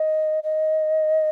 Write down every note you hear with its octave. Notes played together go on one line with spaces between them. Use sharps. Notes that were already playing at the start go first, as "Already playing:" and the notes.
Already playing: D#5
D#5